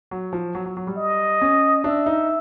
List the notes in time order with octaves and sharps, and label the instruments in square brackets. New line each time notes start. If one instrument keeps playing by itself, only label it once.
[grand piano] F#3
F3
F#3
F#3
F#3
G3
[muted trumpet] D#5
[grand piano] C#4
[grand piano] D4 [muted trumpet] E5
[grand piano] D#4